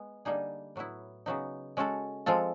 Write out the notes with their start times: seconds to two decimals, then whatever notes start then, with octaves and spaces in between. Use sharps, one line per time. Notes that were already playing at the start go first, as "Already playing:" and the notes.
Already playing: G#3 B3
0.25 D3 G3 A#3 D#4 G#4
0.76 A2 F#3 B3 E4
1.26 C#3 F#3 B3 D#4
1.77 G#3 C#4 F#4 A4
2.26 F3 G#3 C4 F4 A4